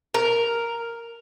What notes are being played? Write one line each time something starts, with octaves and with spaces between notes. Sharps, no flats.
A#4